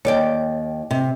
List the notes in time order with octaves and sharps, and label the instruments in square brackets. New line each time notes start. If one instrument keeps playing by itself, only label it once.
[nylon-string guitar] D#2 D5 G5 [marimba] C#5
[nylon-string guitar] C3